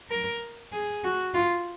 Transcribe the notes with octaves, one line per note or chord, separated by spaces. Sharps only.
A#4
G#4
F#4
F4